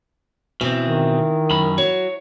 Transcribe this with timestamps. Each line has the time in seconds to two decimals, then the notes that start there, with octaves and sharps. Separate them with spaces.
0.61 B2 E3 C4
0.82 D#3
1.50 F#2 B5
1.78 F#3 C#5